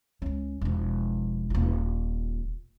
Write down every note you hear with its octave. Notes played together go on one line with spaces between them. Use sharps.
C#2 C#4
E1 F3
D#1 F4